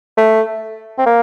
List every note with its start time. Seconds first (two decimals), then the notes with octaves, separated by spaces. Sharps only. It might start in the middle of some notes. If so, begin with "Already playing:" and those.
0.17 A3
0.98 C4
1.06 A#3